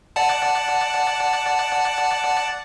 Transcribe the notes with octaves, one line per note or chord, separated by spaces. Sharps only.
D5 F#5 A5